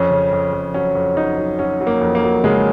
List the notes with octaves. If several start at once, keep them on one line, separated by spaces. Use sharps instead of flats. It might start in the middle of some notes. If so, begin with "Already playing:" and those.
Already playing: F2 C#4
C#3
F2
F2
F#3 C#4
F2
F#3 D#4
F#3
F#3 C#4
F#3
A#3
F2
A#3
F#3
C#3 G#3